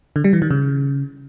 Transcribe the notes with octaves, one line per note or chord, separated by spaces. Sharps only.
D3
G3
E3
D#3
C#3